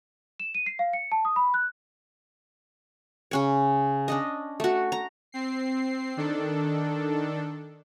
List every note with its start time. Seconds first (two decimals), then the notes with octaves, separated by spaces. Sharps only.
0.40 E7
0.55 D#7
0.66 C7
0.79 F5
0.93 C#7
1.12 A5
1.25 D#6
1.36 B5
1.54 F#6
3.31 C#3 C#4 C#5
4.08 C#4 D4 D#5
4.60 A3 F#4
4.92 A#5
5.32 C4 C7
6.17 D#3 D4 A4